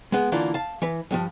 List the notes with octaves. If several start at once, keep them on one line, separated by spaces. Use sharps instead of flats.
G#3 B3
D3 E3 A#3 D4 F4 A#4
F5 A5
E3 B4
E2 G2 F3